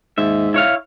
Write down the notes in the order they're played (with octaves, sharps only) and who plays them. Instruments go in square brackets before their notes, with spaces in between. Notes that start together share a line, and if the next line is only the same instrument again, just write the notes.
[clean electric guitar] D#2 E5 [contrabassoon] G#2
[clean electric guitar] E4 C#5 F5